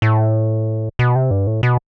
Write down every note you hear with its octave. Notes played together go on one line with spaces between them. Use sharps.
A2
B2
C3
G2
A2
B2